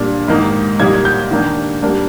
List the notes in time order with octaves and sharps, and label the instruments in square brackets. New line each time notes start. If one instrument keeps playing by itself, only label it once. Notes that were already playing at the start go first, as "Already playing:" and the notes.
Already playing: [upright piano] A#2 G3 D4
G#2 D#3 A#3 D#4
A#2 G3 A#3 D#4 G#6
G6
D#3 A#3 D4
G3 A#3 D4